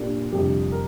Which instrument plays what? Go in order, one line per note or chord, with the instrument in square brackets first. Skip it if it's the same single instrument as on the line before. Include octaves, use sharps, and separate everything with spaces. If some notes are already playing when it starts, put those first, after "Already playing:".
Already playing: [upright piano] A#2 A#3 D4 G4 A#4
F2 C3 G3 D4 G4
A#4